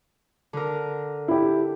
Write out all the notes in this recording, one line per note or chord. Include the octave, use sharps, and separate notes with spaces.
D3 A#4
E4 G4